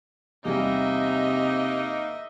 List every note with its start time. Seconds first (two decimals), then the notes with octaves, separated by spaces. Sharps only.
0.45 E2 C3 G3 A#3 D#4 D#5 E5